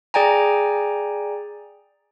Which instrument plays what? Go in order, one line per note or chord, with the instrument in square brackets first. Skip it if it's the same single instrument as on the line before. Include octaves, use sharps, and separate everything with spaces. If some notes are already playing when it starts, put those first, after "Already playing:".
[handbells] G#4 D5 G5 G#5 A#5